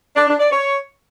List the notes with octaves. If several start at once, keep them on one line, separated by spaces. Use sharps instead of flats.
D4
D4
D5
C#5